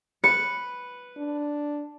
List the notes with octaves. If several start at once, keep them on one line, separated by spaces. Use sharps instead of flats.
B4 C#7
D4